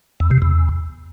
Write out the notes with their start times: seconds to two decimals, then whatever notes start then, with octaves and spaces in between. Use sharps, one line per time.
0.20 E2
0.31 C3
0.42 E2